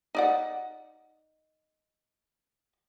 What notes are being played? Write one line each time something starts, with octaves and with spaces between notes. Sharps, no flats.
D#4 D5 F#5